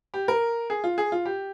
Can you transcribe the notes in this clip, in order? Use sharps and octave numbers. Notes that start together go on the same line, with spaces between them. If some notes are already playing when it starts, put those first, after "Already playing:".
G4
A#4
G#4
F4
G#4
F4
G4